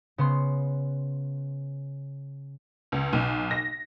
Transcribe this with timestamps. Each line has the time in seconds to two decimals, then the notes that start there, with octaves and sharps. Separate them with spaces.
0.18 C#3 B3 C6
2.92 C#2
3.13 B1
3.51 A#6